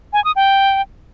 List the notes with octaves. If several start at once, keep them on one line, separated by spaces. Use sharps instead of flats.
G#5
D#6
G5